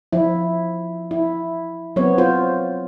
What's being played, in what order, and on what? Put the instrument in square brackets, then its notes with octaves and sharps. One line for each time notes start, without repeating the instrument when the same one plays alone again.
[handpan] F3 E4
E4
F#3 B3 C4 C#5
F4 C5